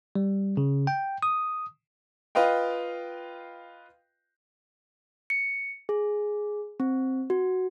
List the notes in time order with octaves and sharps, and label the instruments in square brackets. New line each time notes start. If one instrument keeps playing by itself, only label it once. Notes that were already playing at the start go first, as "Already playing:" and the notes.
[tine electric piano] G3
C#3
G5
D#6
[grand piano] F4 B4 D#5 F5 G5
[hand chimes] C#7
G#4
C4
F#4